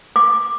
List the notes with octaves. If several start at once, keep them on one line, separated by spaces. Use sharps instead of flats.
D6